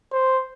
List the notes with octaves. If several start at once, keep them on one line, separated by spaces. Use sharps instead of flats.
C5